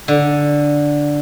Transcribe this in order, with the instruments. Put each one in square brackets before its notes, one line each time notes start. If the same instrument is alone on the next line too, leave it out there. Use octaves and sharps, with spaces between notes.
[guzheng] D3